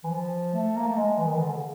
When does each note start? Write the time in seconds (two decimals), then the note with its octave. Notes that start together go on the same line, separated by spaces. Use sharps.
0.04 E3
0.10 F3
0.54 A3
0.76 A#3
0.87 A3
0.97 G#3
1.18 E3
1.25 D#3
1.33 E3
1.41 D3
1.56 C#3